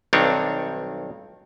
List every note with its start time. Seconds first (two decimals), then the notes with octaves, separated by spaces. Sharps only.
0.13 B1 G2 D#3 C4 D4 C#5